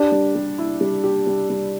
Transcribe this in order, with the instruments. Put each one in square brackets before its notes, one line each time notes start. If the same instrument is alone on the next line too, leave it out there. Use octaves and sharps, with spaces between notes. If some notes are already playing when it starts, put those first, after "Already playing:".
Already playing: [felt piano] D4 [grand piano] G4
[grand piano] G3
G3
E4
G3
G4
G3
G3